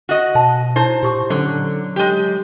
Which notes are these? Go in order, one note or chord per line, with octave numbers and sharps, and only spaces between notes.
F#4 D#5
B2 C5 F#5 A5
D#4 E4 C5 C#5
A#2 G4 C#6 D6
D3 F#3 C#4
G#3 G4